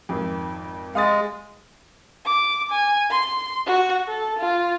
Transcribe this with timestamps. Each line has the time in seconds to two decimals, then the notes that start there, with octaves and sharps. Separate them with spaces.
0.09 G#1 F2
0.95 G#3 F5 D#6 A6
2.25 D6
2.70 G#5
3.11 C6
3.66 F#4
4.08 A4
4.38 F4